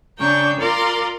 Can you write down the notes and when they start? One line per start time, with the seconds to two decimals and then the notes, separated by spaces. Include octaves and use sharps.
0.18 C#3 D4 G5 A#5 C#6
0.59 F4 A#4 D5 C6 D6